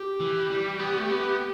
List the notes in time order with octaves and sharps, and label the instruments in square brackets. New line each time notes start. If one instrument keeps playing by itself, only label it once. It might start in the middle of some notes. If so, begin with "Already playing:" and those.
Already playing: [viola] G4
[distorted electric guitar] E3
G3
B3
A3
B3